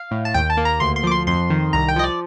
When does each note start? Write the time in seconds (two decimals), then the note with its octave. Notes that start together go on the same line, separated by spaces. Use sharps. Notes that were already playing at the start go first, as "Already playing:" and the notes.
Already playing: F5
0.11 A2
0.25 A5
0.34 D#2 G5
0.50 A5
0.57 A#3
0.65 A#5
0.80 D2 C6
0.96 C6
1.03 F3 D6
1.11 C6
1.27 F2 C6
1.50 D#3
1.73 C2 A#5
1.88 G5
1.96 F3 D#5
2.04 D5